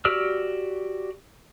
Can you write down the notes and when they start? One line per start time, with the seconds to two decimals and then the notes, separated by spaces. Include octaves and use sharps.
0.05 F#4 G4 D5 E6 F6